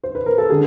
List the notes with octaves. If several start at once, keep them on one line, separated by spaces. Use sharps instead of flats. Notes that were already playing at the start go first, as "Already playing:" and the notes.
C5
B4
A#4
A4
D3 G#4